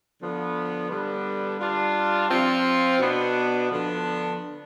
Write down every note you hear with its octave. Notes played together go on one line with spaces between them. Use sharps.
D3 F3 B3
D3 G3 B3 D4
G3 D4 F4
F3 C4 F4
B2 B3 D4
D3 F3 B3 D4